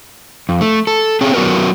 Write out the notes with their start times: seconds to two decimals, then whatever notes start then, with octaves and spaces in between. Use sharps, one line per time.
0.49 F2
0.61 A3
0.87 A4
1.21 C4 C#4 G#4
1.34 F#3 B3 F#4 A#4 B4